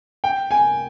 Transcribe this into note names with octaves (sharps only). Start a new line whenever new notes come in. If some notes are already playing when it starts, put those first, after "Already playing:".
G5
G#5